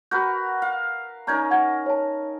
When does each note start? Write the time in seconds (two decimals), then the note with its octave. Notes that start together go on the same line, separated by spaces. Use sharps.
0.11 F#4 A#4 B4 G6
0.62 F5
1.27 C#4 D#4 A#4 A#5 G6 G#6
1.51 F#5 G#6
1.86 C#5 A5